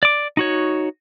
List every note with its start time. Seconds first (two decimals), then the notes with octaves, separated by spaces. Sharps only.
0.03 D5 D6
0.37 D#4 F#4 C#5